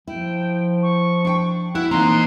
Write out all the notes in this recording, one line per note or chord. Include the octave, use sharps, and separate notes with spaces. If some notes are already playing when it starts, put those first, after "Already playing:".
F3 E4 G5
C#6
D4 G5
E4 F#5 F#6
A#2 E3 A#3 C4 D#4 A#5 C6